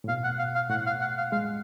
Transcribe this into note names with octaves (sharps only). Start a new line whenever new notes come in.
A2
B2 F5
F#5
F5
F5
A2 F#5
F5
F#5
F5
G#3 F5